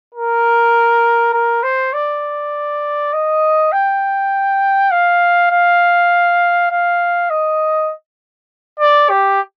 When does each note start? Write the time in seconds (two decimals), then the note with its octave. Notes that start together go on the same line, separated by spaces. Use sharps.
0.14 A#4
1.33 A#4
1.63 C5
1.93 D5
3.13 D#5
3.72 G5
4.91 F5
5.51 F5
6.71 F5
7.30 D#5
8.80 D5
9.09 G4